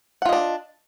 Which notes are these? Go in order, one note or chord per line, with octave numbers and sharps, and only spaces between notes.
D4 F4 D#5 F#5